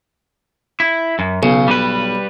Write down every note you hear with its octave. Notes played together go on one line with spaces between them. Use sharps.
E4
F#2
B1 C#3
G3 B4